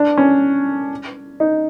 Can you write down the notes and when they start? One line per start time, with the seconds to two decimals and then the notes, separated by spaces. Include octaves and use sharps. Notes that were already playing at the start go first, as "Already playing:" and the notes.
Already playing: D4
0.17 C#4
1.40 D#4